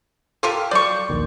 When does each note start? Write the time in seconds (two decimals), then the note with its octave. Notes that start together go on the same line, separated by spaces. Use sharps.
0.43 F4 G4 A4 A#4 G5
0.71 F#3 D5 C6 C#6 G6
1.09 A#1 D#2 D#3